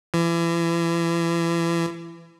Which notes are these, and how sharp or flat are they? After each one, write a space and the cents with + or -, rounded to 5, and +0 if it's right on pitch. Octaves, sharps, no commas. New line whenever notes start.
E3 +35